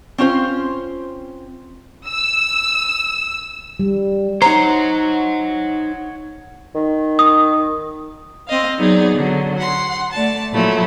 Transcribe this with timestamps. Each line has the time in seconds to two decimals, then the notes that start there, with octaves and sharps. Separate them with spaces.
0.18 C4 C#4 F4 C5
2.08 E6
3.80 G3
4.42 D#4 C5 C#5 F#5 A#5
6.75 D#3
7.19 D#6
8.48 C4 D#5 F5
8.79 F#3 B3 D#4 G#4 D5
9.15 D3 F#3
9.58 F#5 C6
10.12 A3 D5 A5
10.52 A#2 F3 F#3 A3 E4